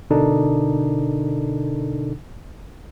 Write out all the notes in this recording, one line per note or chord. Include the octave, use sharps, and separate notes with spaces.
B2 D3 D4 D#4 A4 A#4